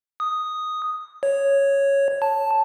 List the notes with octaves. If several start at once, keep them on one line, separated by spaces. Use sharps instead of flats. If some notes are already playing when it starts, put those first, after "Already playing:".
D#6
C#5
A5